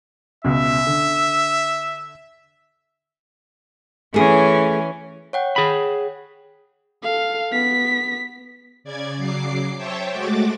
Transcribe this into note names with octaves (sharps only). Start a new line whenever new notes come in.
C#2 B2 E5
D3
E3 A3 C#4 G#4
C#5 F#5 G5
G#4 B5
A4 F5
B3 B6
C#3 D5 G#6
C#3 F#3 D6 C7
C5 C#5 E5 G5 A5
G#3 A3 F#4 D6 A6